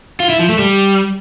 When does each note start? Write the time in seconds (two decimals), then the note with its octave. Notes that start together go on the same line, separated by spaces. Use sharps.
0.20 F4
0.30 E4
0.39 F3
0.49 A3
0.59 G3